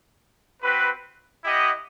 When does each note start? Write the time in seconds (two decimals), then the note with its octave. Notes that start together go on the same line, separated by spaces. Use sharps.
0.62 C4 F#4 B4
1.43 E4 G4 D#5 F#5